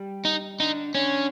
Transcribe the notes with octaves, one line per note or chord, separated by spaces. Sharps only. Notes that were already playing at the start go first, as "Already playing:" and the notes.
Already playing: G3 G4
D#4
D3 D4 D#4
D3 C#4 D4